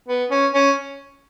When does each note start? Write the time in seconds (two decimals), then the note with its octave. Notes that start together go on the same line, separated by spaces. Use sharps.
0.08 B3
0.30 C#4
0.54 C#4